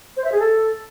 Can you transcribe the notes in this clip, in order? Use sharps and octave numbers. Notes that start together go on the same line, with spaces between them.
C5
E5
G#4
A4